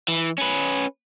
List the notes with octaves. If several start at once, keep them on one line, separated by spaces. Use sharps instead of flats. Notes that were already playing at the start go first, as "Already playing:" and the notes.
E3
C#4 B4